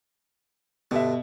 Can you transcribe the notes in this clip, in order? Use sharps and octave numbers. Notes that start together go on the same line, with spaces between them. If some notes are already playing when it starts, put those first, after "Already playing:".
G2 B2 D3 E5